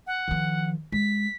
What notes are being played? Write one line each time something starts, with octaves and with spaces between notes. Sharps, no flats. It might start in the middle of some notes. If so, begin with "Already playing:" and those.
F#5
D#3 F3
G#3 B6